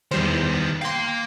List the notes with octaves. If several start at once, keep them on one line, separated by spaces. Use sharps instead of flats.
E2 D#3 G3 B3 C5
A#3 F5 G5 C6